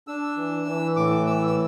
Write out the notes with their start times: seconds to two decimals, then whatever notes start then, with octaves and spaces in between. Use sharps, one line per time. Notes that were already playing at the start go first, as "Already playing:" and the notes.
0.08 D4 E6
0.37 E3
0.68 E3
0.96 A2 D6
1.26 E3 E6
1.47 E6